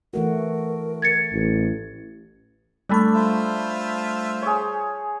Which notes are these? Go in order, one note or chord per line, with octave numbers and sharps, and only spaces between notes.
E3 A3 F#4 A#4
G#6 A6 C#7
A1
G3 A3 D4 A4 B5 C#6
F4 C5 E5
G#4 C#5